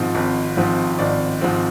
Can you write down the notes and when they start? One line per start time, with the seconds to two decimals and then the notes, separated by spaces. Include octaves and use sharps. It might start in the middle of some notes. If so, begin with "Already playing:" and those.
Already playing: G#1 G#2 F3 C4
0.15 G#1
0.57 G#2 F3 C4
0.99 G#1 D5
1.41 G#2 F3 C4